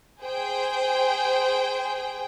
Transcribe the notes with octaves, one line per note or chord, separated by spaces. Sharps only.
G#4 C5 G5